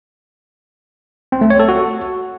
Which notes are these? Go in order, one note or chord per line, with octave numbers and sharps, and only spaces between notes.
C4
A3
C#5
A4
F#4